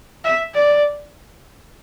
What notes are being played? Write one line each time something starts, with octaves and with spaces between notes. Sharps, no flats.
E5
D5